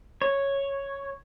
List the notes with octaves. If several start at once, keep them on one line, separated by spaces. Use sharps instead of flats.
C#5